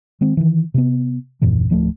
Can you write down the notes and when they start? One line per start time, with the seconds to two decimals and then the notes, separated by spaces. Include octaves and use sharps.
0.21 D#3 G#3 C4
0.37 D#3 E3
0.74 C3 B3
1.42 D#1 F#2 A#2 E3
1.70 D1 F3 G3 A3